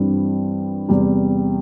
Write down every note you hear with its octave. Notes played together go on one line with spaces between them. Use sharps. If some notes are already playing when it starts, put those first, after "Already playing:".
Already playing: G2 E3 G3 C4
E2 C3 G3